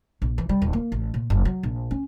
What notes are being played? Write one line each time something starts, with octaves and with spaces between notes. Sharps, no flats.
A#1
E3
G3
D#1
A#3
A1
A#2
F#1
F#3
A#1
C#4